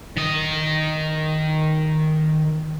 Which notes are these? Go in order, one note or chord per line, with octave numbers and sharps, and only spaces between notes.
D#3 D#5